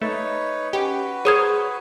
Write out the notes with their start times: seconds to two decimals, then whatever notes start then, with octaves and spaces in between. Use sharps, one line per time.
0.01 A3 D#4 B4 C#5
0.73 C#4 F#4 G4 B4
1.25 G#4 A#4 C5 C#5 D#6 G#6